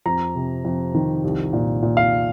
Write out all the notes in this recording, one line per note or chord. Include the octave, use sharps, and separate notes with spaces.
F2 A#5
C3
F2
D#3
C2
A#2
A#2
F5